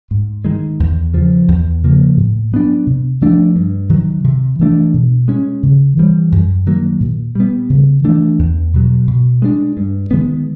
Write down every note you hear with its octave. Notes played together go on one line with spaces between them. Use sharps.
G#2
D#3 G#3
E2
C#3 F3
E2
C#3 F3 A#3
A2
F#3 B3 D4
C3
F3 A3 D4
G2
D#3 F#3
C3
E3 A3 D4
B2
G#3 C#4
C#3
E3 G3
F#2
D#3 F#3 A#3
A#2
G3 B3
C#3
E3 A3 D4
E2
B2 F#3
B2
G#3 B3 D4
G2
D#3 G#3 B3